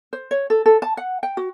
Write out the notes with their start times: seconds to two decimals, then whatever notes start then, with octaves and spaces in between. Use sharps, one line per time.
0.13 C5
0.31 C#5
0.50 A4
0.66 A4
0.82 A5
0.97 F#5
1.23 G5
1.37 F#4